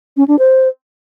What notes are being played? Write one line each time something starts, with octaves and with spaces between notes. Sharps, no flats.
C#4
D4
C5